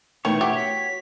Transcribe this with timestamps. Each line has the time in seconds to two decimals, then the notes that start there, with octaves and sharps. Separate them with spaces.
0.25 B2 D#3 E3 A3 C#5 C#6
0.41 F#4 G4 E5
0.56 B6